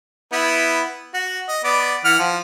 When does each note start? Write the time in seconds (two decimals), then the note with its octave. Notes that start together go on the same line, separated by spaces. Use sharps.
0.33 B3 E4
1.14 F#4
1.49 D#5
1.64 B3 D5
2.04 E3 F#5 F6
2.19 F3